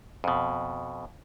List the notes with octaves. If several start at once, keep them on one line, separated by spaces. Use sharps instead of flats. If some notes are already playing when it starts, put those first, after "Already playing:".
F2 B2